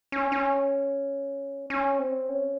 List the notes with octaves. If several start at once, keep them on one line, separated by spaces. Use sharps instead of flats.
C#4
C#4
C#4
C4
C#4